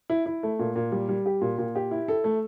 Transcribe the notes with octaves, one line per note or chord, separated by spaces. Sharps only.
E4
E4
A3
A#2
A#2
G3
G3
G4
A#2
A#2
G4
E4
A4
A3